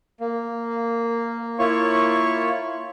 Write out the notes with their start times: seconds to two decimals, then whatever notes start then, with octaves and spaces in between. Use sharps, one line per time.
0.21 A#3
1.59 A#3 E4 F4 C#5 C#6